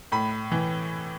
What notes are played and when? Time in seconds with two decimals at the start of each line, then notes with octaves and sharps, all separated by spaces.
0.12 A2 B5
0.52 E3